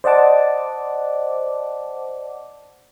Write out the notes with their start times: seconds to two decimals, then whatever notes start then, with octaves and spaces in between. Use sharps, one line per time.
0.04 C5 D5 D#5 F#5 A5 D6